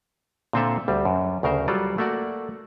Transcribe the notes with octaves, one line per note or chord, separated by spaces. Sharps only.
A#2 D3 C4 F4 A4 E5
D2 G3
F#2
D2 C#3 A#4 C5
F#3 G3 F4 A4 D5
A3 A#3 F#4 D5 F#5